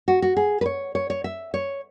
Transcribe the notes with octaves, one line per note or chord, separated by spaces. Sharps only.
F#4
F#4
G#4
B4
C#5
C#5
C#5
E5
C#5